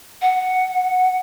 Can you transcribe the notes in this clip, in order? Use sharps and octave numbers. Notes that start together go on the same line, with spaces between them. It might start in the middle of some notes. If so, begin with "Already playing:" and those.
F#5